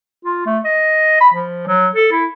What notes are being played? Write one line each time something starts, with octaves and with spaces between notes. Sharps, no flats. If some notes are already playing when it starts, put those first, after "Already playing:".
F4
A3
D#5
B5
F3
F#3
A4
E4